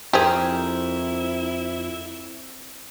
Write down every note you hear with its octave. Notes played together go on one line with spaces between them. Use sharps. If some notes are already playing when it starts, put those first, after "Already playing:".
F2 E4 G4 G#4 A#4 C5